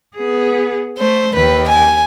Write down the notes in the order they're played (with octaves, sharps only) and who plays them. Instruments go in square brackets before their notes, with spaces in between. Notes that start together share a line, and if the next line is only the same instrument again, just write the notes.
[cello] B3 G#4
[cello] A3 [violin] C5
[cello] D#2 G5 [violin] B4
[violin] G#5